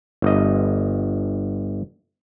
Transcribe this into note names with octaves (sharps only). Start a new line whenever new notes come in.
G1 D#5